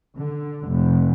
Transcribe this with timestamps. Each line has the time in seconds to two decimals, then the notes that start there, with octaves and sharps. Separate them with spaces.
0.16 D3
0.67 F1